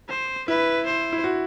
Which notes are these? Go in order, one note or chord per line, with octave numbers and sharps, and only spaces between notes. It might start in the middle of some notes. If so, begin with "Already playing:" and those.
C5
E4 B4
C5
E4
F#4